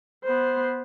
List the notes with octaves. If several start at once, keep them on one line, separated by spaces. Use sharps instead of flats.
B3 C5